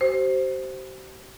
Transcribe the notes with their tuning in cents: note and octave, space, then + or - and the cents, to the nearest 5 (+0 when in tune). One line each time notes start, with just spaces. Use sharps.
G4 -45 C5 +0